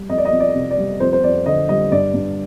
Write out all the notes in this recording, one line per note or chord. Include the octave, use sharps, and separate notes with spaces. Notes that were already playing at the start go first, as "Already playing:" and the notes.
Already playing: G3
F2 D#5
D5
D#5
F2
D5
C3
D5
G3
F2 C5
C5
F2 D5
D3 D#5
G3 D#5
G2 D5
G2